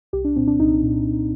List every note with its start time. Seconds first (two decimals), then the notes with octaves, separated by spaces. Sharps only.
0.13 C2 G4
0.25 D4
0.36 A#2 C4
0.48 D4
0.60 C2 D#4
0.83 A#2